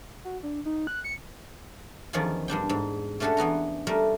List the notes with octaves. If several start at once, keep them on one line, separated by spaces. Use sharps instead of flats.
F#4
D4
D#4
F#6
C#7
E2 D#3 F3 C#4 D5 G#5
G2 G3 D4 G5
G#2
A3 C#4 D4 F#4 G4 A4
E3 B3 F#4 A#5
G3 A3 A#4